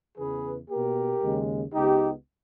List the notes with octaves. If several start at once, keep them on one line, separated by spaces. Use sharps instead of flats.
E2 C#3 E3 G#4 B4
B2 A#3 G4 A#4
D#2 C#3 G#3
C#2 C#3 G#3 B3 D#4 G4